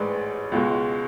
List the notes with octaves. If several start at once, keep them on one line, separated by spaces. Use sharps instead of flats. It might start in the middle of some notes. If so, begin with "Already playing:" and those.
Already playing: A1 G#2 G#3 B4 D5
C#2 B2 G#3